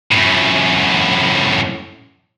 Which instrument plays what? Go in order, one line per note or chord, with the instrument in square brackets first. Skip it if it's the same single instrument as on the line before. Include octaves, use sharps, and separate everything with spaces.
[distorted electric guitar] F#2 A2